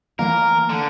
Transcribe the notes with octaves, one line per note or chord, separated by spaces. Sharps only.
E3 A#3 A#4 F5
D3